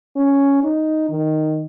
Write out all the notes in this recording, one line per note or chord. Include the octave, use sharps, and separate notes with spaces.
C#4
D#4
D#3